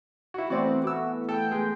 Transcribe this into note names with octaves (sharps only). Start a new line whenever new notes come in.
E4 F#4
E3 A3 B3 C4 F#4 D5
F#4 D6 E6
A4 G5
G#3